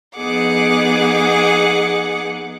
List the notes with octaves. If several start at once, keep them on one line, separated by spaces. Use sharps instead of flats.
F2 B3 D#4 G#4 F#5 D6